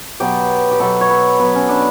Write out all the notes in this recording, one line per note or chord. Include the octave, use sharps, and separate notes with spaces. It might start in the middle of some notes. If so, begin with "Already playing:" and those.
B2 F#3 B3 G4
G4
B2 F#3 B3 A4
C#5
B4
B2 F#3 B3 B4
C#4
D4